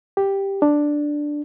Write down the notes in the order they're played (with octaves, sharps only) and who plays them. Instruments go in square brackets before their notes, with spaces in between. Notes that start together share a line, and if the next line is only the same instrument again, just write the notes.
[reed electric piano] G4
D4